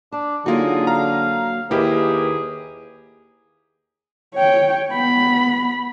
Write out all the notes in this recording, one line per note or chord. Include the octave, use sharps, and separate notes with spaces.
D4 A5
D3 F#3 A#3 D#4 F4 F#4 G#4
F5 A#5
D#2 A#3 E4 G4 G#4 B4
C#5 G5
B3 B5